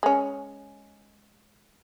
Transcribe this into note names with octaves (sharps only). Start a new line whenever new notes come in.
G#3 C#4